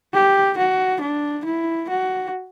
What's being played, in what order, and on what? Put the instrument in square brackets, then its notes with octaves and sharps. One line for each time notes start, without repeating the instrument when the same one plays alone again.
[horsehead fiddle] G4
F#4
D4
E4
F#4